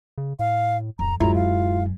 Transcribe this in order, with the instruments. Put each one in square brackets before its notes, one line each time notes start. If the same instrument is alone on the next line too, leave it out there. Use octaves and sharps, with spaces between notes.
[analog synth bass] C#3
[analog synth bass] A2 [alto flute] F5
[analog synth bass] D1 [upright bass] F2 [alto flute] A#5
[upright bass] D1 F#2 [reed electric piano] F#3 G#3 E4 [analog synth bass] F4 [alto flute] A#5
[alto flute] F5